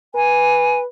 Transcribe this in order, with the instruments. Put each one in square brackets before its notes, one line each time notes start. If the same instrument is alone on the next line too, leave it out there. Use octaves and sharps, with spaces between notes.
[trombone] B4 [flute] G#5